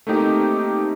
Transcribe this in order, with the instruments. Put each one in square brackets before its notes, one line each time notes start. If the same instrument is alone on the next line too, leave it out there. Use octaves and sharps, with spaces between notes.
[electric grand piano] A3 A#3 C4 D#4 G4